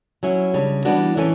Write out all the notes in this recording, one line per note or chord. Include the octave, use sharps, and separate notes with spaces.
F#3 C#4 E4
C#3 G3 D4
E3 G3 B3 D4 F#4
A2 E3 A3 C#4